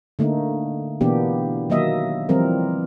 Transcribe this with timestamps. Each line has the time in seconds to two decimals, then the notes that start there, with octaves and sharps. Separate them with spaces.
0.19 D3 A3 A#3 D#4
1.01 B2 E3 A#3 B3 D4 G4
1.70 D#3 F#3 A#3 D#5 E5
2.29 E3 F3 G3 C4 A#4